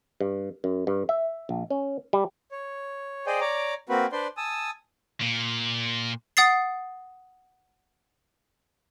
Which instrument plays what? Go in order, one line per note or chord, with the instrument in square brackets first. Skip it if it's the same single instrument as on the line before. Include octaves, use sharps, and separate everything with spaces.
[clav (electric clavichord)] G2
F#2
G2
E5
A#1
C#4
G3
[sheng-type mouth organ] C#5
G#4 C5 D5 D#5 G5 G#5
C#5 D5 A#5 D6
A#3 C4 F#4 B4
D4 B4 C5 D5 C6
G#5 A5 D#6 E6
[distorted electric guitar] A#2
[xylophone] F#5 D#6 A6 C7